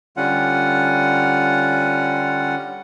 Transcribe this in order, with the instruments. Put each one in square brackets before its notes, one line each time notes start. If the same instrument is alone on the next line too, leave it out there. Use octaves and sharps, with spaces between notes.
[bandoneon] D3 G3 C#4 F4 F#5